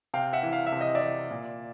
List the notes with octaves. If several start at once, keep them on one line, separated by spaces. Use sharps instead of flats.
C3 F5 G5
E5 F#5
E3
F5
E5
C3
D#5
D5 E5
E3
A#2